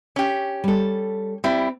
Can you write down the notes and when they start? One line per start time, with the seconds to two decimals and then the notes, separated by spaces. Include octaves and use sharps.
0.16 C#4 G4
0.64 G3 A4
1.44 G3 C4 E4